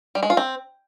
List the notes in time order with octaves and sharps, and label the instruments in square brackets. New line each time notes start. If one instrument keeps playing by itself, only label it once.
[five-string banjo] G3
G#3
F4
C4